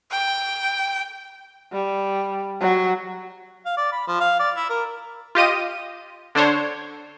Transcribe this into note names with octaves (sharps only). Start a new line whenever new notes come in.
G5
G3
F#3
F5
D5
B5
F3
F5
D5
E4
A#4
F4 G4 D#5 D#7
D3 D4 C5 C#5